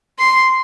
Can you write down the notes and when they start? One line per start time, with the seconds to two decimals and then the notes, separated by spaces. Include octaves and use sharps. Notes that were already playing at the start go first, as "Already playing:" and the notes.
0.19 C6